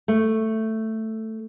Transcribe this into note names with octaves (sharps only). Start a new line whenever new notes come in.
A3